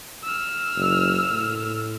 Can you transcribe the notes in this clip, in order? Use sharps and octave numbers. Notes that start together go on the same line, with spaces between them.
E6 F6
F#1
A2